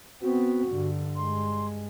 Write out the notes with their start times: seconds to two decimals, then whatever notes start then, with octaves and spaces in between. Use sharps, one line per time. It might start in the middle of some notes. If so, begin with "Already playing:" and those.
0.22 B3 C4 F#4
0.68 G2 D3
1.17 G2 G#3 C6